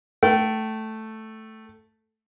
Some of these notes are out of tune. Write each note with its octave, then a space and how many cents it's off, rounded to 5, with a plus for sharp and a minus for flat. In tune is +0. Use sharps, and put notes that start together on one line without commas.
A3 +0 G5 -30